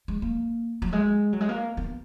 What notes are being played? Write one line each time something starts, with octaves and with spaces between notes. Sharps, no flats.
G#3
A#3
F#3
G#3
F#3
G#3
A#3
B3